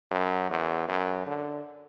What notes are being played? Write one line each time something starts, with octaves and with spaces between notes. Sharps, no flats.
F#2
E2
F#2
D3